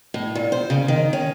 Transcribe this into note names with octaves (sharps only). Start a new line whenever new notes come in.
A2
A#2
C5
C#3
D#3
C#4